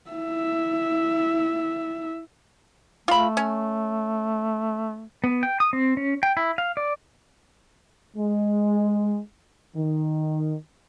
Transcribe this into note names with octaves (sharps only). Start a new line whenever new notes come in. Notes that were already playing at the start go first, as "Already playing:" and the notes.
E4 E5
A3 F4 B5
C#4
B3
G5
D#6
C4
C#4
G5
E4
F5
D5
G#3
D#3